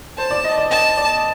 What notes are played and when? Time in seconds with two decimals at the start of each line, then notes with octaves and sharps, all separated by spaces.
0.18 C5 A5
0.31 D5
0.44 D#5
0.58 D5
0.71 D#5 A5
0.97 D5